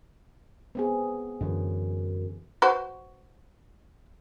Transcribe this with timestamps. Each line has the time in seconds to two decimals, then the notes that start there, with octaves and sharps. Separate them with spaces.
0.75 B3 C4 G#4
1.41 F#2 D3 E3
2.62 F#4 B4 C5